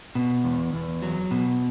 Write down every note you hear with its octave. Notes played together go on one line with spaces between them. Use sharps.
B2
E2
E2
F#3
B2